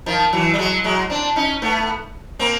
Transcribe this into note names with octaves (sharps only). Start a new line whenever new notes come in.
D#3 F3
E3 F#3
G3
F#3 G#3
F#3 G#3
C4 D4
C#4 D#4
A3 B3
A#3 C4